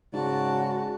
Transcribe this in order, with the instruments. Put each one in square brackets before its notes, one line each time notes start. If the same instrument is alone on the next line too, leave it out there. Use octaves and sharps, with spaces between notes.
[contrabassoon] G#2 [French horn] C#3 [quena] F#4 [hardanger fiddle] D5 A5